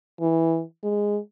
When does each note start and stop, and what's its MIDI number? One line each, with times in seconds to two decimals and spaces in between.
0.20 0.62 52
0.83 1.18 56